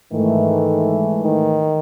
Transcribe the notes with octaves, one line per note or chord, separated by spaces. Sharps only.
G#2 D#3 E3 A3
D#3